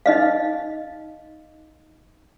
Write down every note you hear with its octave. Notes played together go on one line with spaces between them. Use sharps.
D#4 D#5 F5